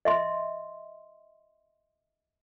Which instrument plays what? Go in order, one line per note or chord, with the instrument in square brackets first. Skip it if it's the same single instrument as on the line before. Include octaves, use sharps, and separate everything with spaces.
[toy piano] D#5 E5 C6